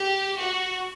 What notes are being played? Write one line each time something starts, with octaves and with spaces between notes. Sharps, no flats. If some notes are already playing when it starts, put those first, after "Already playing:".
Already playing: G4
F#4